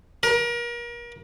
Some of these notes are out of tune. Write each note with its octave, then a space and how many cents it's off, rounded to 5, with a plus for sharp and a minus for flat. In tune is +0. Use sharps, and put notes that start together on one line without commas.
A#4 +35